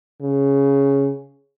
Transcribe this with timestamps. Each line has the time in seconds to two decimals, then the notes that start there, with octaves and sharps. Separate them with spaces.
0.22 C#3